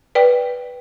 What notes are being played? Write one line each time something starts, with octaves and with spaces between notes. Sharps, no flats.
B4 D5 G5